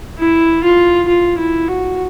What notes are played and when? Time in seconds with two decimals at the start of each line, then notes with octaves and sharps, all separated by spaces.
0.18 E4
0.64 F4
1.08 F4
1.38 E4
1.68 F#4